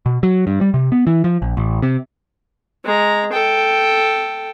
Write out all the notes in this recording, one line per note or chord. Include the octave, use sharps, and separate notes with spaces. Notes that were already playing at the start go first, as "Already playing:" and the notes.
B2
F#3
G2
G3
C3
B3
E3
F3
A#1
A1
C3
G#3 A#5
A4 G5